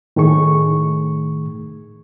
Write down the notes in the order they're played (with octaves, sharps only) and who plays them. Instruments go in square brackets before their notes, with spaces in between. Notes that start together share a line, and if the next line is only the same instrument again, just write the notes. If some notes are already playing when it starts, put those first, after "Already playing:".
[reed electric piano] A2 D#3 A3 G#4 C#6